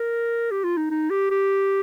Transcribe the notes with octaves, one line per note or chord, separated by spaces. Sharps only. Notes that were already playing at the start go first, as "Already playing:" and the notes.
Already playing: A#4
G4
F4
D#4
D#4
G4
G4